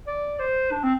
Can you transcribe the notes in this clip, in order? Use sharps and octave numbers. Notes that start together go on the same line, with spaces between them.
D5
C5
D4
C4